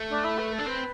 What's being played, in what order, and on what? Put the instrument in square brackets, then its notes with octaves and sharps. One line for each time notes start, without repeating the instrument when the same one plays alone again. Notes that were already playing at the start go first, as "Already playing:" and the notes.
Already playing: [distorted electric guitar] A3
[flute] D4
E4
B4
A4
[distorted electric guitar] D4
[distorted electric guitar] C4 [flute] B4